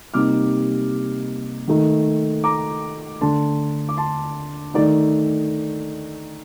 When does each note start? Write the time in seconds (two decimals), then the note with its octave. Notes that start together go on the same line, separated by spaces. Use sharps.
0.14 C3 G3 A#3 D#4 D6 F6
1.68 D#3 A3 D#4
2.44 A#5 D6
3.21 D3 A3 D4 A5 C6
3.89 D6
3.97 A5 C6
4.74 D#3 A3 D#4 D5